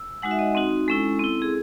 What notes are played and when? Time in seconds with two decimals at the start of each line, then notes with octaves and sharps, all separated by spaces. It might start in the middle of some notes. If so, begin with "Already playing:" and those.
Already playing: E6
0.22 G#3 D#4 F#4 F#5
0.31 E5
0.39 D#5
0.55 C4 D#4 F#4
0.88 G#3 C#4 E4 A4
1.19 C4 E4
1.42 G#4